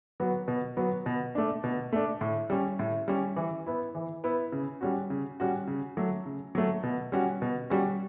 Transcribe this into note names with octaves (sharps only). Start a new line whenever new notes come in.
F#3 B3 F#4
B2
F#3 B3 F#4
B2
A3 D4
B2
A3 D4
A2
G3 C#4
A2
G3 C#4
E3
B3 E4
E3
B3 E4
C#3
G3 C#4 F#4
C#3
G3 C#4 F#4
C#3
F#3 A3
C#3
F#3 A3
B2
G3 C#4 F#4
B2
G3 C#4 F#4